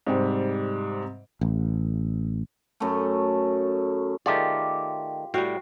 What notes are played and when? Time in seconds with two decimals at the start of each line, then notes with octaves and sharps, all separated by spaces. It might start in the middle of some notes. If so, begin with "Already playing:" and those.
0.07 G#2 C3 G3
1.41 A1
2.80 F#2 A3
4.26 D#3 A3 F4 G4 G#4 A#4 D5
5.34 A2 G3 F#4 F5 G5